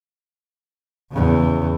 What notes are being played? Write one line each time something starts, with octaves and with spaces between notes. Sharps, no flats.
E2 C#3